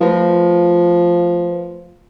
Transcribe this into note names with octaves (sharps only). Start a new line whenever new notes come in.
F3 A3 F4 B4